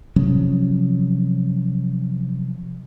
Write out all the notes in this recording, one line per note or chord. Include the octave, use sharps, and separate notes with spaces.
C3 F3 F#3 C#4